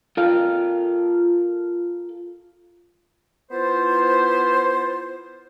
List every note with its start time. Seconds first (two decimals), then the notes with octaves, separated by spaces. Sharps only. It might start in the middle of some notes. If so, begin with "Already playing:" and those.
0.17 F4 A4 A#4 F5
3.50 B3 E4 F4 C5